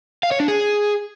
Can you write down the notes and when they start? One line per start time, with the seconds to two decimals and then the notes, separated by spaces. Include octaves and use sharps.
0.23 F5
0.31 C#5
0.40 D4
0.48 G#4